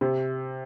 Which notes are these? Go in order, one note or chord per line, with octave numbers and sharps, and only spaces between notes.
C3